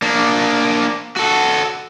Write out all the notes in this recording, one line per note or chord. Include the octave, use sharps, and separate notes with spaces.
A#3 D4
F#4 A4